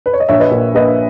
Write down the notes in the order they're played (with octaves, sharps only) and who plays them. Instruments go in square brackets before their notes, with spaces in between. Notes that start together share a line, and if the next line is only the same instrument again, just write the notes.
[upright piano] B4
C#5
D#5
A#1 C#5 E5
B4 D#5
A#2
A#3 B4 D#5